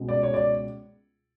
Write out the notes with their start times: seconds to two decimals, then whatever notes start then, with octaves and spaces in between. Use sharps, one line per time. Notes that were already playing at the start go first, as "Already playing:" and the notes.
Already playing: C#2 B2 G#3
0.09 D5
0.23 C#5
0.34 D5